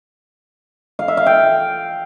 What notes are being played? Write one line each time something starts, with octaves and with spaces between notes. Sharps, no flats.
F5
E5
F5
G5